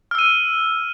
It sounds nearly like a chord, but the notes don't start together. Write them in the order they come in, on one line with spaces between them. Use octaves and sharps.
F6 E6 D#7